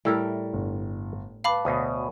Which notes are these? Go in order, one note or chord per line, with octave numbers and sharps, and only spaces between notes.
A2 G3 E4 A4 A#4 D5
G1
B4 F5 A5 B5 D6
D2 B2 C#5 D#6